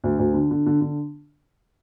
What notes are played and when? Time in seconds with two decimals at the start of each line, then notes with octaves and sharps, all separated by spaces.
0.04 D2
0.19 D2
0.34 D3
0.51 D3
0.66 D3
0.81 D3